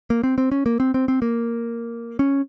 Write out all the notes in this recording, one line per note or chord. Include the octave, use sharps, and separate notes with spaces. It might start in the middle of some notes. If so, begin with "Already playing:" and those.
A#3
C4
C4
C#4
A#3
C4
C4
C4
A#3
C#4